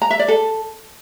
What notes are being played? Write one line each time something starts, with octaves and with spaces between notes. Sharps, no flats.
A#5
E5
D5
A4